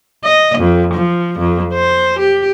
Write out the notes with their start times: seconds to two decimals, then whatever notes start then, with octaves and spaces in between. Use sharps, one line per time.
0.24 D#5
0.58 F2
0.94 F3
1.39 F2
1.73 C5
2.19 G4